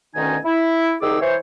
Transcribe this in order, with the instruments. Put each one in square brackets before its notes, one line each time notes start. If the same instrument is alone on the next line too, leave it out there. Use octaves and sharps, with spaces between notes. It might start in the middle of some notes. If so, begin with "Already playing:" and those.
[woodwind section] D2 B2 D#3 C#4 D#4 G#5
E4
C2 D#3 D#4 G#4 D6 E6
E3 C5 C#5